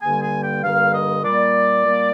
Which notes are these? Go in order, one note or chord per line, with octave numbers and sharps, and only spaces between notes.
G2 D3 G3 A#3 G#5
G#5
G5
G2 D3 G3 A#3 F5
D#5
A#2 G3 A#3 D5
A#2 G3 A#3